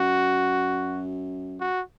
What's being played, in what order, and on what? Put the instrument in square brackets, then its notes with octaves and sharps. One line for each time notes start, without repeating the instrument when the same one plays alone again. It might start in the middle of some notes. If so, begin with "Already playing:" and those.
Already playing: [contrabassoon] F#2 [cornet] F#4
[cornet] F#4